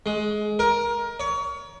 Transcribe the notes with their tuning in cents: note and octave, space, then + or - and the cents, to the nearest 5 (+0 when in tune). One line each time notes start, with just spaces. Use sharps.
G#3 +20
A#4 +20
C#5 +30